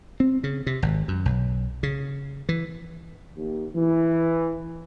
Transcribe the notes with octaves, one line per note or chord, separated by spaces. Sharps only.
C4
C#3
C3
G#1
F#2
B1
C#3
E3
D#2
E3